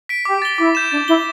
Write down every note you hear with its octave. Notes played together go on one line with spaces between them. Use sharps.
B6 D7
G4 D6
A6 G7
E4 D6
G6 E7
D4 A6
E4 G7